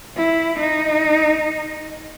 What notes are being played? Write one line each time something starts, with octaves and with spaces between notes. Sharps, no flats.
E4
D#4